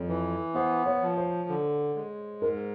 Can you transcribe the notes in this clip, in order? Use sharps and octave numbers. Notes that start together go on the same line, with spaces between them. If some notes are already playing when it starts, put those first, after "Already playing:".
Already playing: F2 C#5
E3
B3 C5
C#5
F3
C5
D3
G#3
G#2 A#4